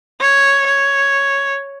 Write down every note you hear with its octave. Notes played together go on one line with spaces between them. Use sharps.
C#5
C#5